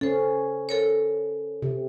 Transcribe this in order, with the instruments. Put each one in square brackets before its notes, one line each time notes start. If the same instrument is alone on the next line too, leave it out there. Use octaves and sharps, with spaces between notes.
[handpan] C#4 [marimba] A4 C5
[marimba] A4 A#4 C#5
[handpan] C3